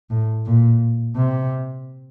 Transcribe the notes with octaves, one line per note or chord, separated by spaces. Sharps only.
A2
A#2
C3